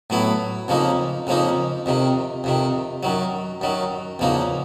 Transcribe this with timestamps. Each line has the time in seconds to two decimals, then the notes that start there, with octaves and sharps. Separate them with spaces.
0.10 A2 F#3 B3 E4
0.68 F2 C#3 F3 A#3 D#4
1.27 F2 C#3 F3 A#3 D#4
1.86 F2 C3 D#3
2.44 F2 C3 D#3
3.03 F#2 D#3 F#3
3.61 F#2 D#3 F#3
4.19 E2 C#3 F3 A#3 D#4